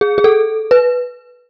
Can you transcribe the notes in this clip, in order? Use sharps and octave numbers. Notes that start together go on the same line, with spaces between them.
G#4
G#4
A4
B4